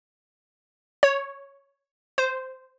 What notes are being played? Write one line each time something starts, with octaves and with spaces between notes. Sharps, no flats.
C#5
C5